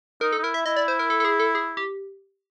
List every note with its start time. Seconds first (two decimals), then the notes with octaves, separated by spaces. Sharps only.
0.21 D#4 A#4
0.32 A4
0.38 D#4
0.43 E4 A#4
0.54 E5
0.66 E4 D#5
0.76 D5
0.88 C5
0.99 A#4
1.10 A4
1.20 A4
1.25 G#4
1.40 A4
1.55 G#4
1.77 G4